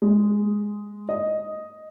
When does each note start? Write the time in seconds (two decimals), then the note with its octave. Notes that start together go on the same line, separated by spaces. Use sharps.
0.02 G#3
1.09 D#5